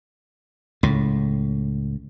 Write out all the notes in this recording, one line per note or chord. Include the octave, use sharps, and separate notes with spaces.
C#2 A2